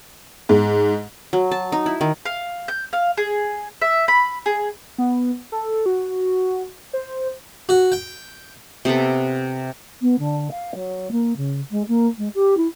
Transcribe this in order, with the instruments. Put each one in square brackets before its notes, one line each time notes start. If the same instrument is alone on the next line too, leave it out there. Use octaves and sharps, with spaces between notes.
[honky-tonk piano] G#2
[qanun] F#3
A5
D#4
E4
D#3
[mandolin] F5
G6
F5
G#4
E5
B5
G#4
[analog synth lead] B3
A4
F#4
C5
[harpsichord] F#4
G5
[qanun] C3 B3 A4 B4
[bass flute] B3
D3
F5
F#3
A#3
C#3
G#3
A#3
G#3
G4
E4